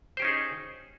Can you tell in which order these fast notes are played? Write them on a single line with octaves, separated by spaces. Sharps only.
C5 G4 C#4 D#4 G#4